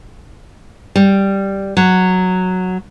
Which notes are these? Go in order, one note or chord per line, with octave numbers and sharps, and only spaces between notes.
G3
F#3